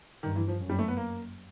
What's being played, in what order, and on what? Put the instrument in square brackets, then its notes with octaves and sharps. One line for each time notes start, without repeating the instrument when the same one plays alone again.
[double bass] G2 [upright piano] D#3
[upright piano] E3
F3
[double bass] F#2
[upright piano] G3
A3
B3
A#3